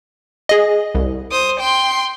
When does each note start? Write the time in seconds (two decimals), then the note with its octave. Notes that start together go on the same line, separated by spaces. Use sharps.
0.49 G#4 D#5
0.95 C2
1.31 C5 D#6
1.60 G5 C6